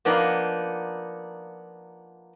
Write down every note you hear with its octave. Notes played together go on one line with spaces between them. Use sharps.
F3 A#3 B3 D4 D#4